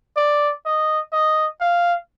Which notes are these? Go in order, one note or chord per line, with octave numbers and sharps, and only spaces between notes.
D5
D#5
D#5
F5